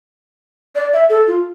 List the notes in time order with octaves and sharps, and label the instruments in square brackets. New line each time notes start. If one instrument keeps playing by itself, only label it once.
[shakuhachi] D5
E5
A4
F4